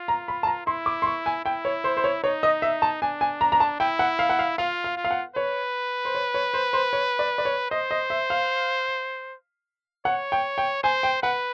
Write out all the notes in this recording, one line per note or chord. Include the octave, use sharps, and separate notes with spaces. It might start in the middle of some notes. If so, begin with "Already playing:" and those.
Already playing: F4
A#5
B5
A5
A#5
E4 C6
D6
C6
C#6
G#5
E4 G5
C#5
C5
C5
C#5
D#4 C#5
D#5
E5
A5
D4 G#5
G#5
A#5
A#5
A5
E4 G5
F#5
F5
F#5
F5
F4 F5
F5
F4
F5
F#5
B4 C#5
C5
C#5
C#5
C5
C5
C#5
D5
D5
C#5
C5 D#5
D#5
E5
F5
C#5 F#5
G5
G5
C5 G#5
G5
B4 F#5